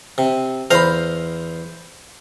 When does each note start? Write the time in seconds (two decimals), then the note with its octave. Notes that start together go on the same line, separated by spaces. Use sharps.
0.18 C3
0.71 E2 C5 F5 A#5 B5